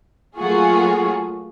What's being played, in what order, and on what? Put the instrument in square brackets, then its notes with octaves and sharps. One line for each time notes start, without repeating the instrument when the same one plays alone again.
[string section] F#3 A3 A#3 F4 F#4 G#4